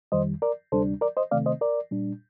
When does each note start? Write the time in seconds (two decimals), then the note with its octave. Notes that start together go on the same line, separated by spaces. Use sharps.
0.12 F2 D#3 G3 C5 D#5
0.42 A#4 D5
0.72 D2 C3 G3 D4 A4 C5
1.01 A#4 D5
1.17 C5 D#5
1.31 C3 D#3 A3 C4 D5 F5
1.46 C5 D#5
1.61 A#4 D5
1.91 A#2 G3 D4